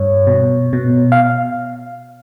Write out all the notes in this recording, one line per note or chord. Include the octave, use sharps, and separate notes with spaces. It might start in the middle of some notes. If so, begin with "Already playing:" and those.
Already playing: G2 C#5
B2
B2
F5